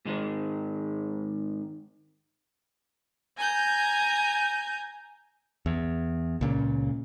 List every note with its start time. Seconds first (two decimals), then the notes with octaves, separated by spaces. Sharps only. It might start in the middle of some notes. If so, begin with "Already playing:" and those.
0.05 G#2 D#3 G#3
3.38 G#5 A#5 G6
5.66 E2
6.41 C#2 A#2 C#3